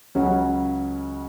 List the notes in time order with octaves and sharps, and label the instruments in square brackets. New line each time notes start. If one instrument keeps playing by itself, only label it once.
[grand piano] C#2 C#3 F#3 C#4 F#4